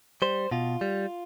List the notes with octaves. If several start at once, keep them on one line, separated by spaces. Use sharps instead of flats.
G3 C5
B2 F4
G3